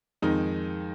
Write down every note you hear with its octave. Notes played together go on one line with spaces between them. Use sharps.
F2 D#3 G#3 D#4